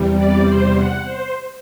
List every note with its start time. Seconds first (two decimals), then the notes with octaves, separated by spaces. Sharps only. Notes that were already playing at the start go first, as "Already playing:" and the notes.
Already playing: E2 C3 G3
0.15 D5
0.45 C5
0.75 F#5
1.04 C5